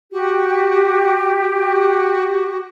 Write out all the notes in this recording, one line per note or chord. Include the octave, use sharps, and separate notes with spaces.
F#4 G4
F#4